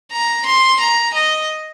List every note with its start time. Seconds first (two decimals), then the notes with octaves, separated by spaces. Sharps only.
0.12 A#5
0.46 C6
0.80 A#5
1.14 D#5